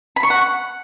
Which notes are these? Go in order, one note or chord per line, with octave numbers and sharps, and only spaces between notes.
B5
C#6
F#5